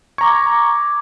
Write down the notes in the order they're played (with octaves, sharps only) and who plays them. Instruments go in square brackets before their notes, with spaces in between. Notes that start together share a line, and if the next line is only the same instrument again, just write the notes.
[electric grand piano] A#5 C#6 [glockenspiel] D6 G#6